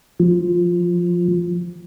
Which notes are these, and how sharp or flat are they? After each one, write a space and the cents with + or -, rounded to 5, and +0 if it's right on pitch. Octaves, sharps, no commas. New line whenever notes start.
F3 +5